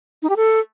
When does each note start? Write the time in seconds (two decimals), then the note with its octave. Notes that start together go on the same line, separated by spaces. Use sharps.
0.22 D#4
0.29 G4
0.36 A4